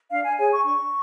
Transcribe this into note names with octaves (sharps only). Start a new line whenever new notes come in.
D4 F5
G#5
G#4 C#5 G#5
C#6
D4 C#6